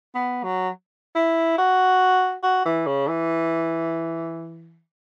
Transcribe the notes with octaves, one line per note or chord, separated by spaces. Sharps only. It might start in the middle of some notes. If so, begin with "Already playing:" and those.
B3
F#3
E4
F#4
F#4
E3
C#3
E3